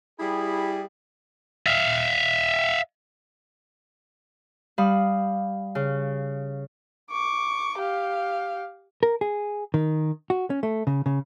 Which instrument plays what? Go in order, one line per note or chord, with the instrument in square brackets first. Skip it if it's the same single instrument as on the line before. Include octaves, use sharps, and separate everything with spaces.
[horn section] G3 E4 G4 G#4
[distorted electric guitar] E5 F5
[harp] G3 F5 B5 D#6
C#3
[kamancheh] C#6 D6
G4 F5
[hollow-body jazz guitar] A#4
G#4
D#3
F#4
C#4
A3
C#3
C#3